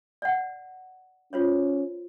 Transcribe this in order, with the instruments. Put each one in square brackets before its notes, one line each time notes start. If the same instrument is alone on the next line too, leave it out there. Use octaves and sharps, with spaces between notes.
[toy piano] D5 F#5
[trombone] C#4 [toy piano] F4 C5 C#5